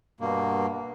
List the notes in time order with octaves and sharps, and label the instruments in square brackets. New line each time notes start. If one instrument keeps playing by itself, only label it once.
[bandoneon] G2 B2 A#3